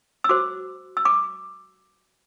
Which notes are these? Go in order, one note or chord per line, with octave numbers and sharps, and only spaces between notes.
E6
F#4 C5 D6
E6
D6